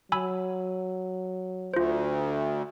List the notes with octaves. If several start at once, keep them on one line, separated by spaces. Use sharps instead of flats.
F#3 G#5 B5 E6
D2 F4 C5